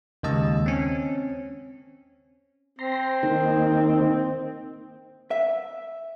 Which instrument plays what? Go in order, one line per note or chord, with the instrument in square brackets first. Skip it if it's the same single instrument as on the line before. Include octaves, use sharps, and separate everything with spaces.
[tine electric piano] D#2 C#3 G#3 D#5 A5 E6
C4 C#4
[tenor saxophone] C4 [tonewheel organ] A#5 C6
[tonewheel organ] D#3 A#3 D#4
[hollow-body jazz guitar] E5